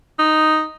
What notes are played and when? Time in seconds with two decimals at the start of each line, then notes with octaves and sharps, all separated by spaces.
0.19 D#4